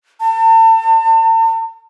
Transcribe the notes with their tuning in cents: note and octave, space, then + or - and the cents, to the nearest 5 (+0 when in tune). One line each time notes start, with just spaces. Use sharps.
A5 +40